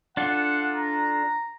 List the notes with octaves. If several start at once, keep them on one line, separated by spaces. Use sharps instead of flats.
D4 F4 A4 F#5
A#5